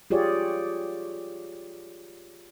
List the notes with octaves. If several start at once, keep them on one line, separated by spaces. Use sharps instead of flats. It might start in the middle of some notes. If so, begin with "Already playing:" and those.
F4 G4 G#4 C#5 D5